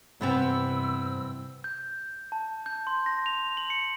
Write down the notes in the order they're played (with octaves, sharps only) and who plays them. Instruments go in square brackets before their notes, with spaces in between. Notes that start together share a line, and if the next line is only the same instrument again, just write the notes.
[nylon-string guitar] G2 [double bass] C3 [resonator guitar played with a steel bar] E3 B3 C4 [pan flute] E6
[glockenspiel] G6
A5
G6
C6
A#6
F7
F#7
C#7